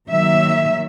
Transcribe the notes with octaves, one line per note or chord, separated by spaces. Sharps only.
D#3 F#3 A#3 E5